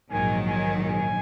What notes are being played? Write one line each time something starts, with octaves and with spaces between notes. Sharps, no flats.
A#1 G#2 D#3 F#3 G#5
G#5
G#5